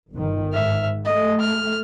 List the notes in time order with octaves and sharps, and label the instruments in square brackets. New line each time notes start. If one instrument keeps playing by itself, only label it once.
[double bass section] G1 D#3
[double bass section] G#2 [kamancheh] E5 F6
[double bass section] A3 [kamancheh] D#5
[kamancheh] F6